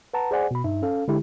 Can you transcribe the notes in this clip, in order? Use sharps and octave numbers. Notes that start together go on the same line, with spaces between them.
B4 F#5 A5 A#5
G#4 C5 D5 F#5 G#5
B2 B5
G2 D#4 E5
C#4 A4 F5
D3 G#3 E4 G4